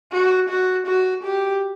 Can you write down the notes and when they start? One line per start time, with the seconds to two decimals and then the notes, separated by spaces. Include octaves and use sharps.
0.13 F#4
0.50 F#4
0.87 F#4
1.24 G4